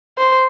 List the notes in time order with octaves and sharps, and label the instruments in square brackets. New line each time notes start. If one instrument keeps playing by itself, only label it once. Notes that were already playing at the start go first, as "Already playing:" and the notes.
[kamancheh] C5